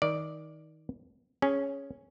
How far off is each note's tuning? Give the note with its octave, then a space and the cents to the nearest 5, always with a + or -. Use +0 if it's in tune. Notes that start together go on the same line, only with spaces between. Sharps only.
D#3 +20 D5 +0
C#4 +0 G#4 +0